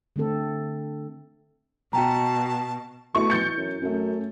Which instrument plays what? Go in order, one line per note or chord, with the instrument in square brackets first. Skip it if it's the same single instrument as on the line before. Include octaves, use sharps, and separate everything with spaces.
[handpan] D3 A3 C4 A4
[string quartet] B2 [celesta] F#4 G5 A#5 [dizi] A5
[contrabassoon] B2 [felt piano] A3 E4 F#4 [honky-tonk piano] C#6
[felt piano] E3 A6 [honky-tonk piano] G6 C#7
[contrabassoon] F#2
[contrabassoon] F#2 [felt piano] A3 C#4